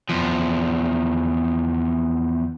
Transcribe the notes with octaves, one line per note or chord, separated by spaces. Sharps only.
E2 F3